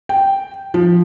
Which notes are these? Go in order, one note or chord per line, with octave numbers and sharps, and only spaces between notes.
G5
F3